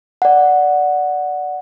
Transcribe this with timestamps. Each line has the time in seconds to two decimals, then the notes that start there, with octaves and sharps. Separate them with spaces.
0.22 D5 F#5